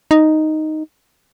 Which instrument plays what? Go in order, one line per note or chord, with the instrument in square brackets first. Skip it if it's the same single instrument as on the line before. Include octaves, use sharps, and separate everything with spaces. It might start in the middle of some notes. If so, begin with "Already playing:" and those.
[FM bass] D#4